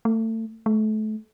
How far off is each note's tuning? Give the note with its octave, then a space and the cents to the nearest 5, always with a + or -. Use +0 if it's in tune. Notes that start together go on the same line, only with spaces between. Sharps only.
A3 +30
A3 -30